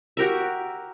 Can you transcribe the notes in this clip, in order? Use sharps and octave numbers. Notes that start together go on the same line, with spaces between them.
F#4 G4 A#4 E5